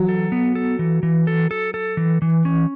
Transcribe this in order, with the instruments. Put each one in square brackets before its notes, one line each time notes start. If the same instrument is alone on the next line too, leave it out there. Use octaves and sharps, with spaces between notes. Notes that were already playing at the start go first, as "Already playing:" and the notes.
Already playing: [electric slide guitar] E3 [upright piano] F#3
[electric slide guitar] A4
B3
A4
E3
E3
A4
A4
A4
E3
E3
C#4